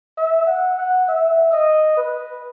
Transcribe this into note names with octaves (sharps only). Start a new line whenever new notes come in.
E5
F#5
F#5
E5
D#5
B4